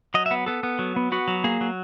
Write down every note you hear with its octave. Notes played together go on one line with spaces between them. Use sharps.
F#3 D#5
E5
B3
B3 A4
B3
F#3
B3
B3 F#4
F#3
A#3 G#4
F#3